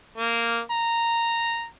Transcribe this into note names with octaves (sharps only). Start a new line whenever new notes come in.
A#3
A#5